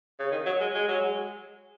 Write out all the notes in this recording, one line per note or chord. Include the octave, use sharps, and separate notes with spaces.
C#3
D#3
F#3
G#3
G#3
F#3
G#3